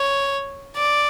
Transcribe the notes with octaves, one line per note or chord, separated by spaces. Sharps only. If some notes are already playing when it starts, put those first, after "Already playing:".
Already playing: C#5
D5